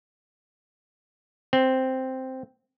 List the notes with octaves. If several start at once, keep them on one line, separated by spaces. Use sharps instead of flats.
C4